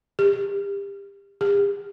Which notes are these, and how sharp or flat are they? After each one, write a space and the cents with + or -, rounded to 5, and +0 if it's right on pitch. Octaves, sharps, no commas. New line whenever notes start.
G4 +30
G4 +45